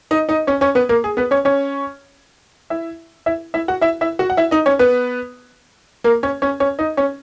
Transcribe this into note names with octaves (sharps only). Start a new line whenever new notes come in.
D#4 D#5
D#4 D#5
C#4 C#5
C#4 C#5
B3 B4
A#3 A#4
G#4
B3 B4
C#4 C#5
C#4 C#5
E4 E5
E4 E5
E4 E5
F#4 F#5
E4 E5
E4 E5
F#4 F#5
F#5
E4 E5
D#4 D#5
C#4 C#5
B3 B4
A#3 A#4
C#4 C#5
C#4 C#5
C#4 C#5
D#4 D#5
C#4 C#5